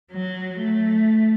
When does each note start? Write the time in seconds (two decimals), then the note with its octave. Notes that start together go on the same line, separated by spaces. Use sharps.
0.12 F#3
0.59 A3